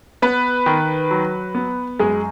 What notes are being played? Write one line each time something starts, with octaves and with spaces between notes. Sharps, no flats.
B3 B4
D#3
F#3
B3
F#2 G#3 G#4